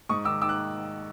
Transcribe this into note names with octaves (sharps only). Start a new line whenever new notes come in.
G#2 C#6 D#6
D#3 D6 E6
D#3 D6 E6
F#6